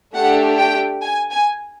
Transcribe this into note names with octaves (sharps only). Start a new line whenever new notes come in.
A3 D4 G4 F#5
G5
G#5
G#5